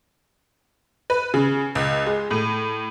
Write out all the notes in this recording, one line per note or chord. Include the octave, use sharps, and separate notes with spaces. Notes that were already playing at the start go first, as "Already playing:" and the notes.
B4
C#3
C#2
G#3
A2